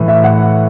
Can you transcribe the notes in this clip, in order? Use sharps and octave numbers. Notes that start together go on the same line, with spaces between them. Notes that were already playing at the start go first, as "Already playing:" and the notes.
Already playing: A2 E3
E5
F#5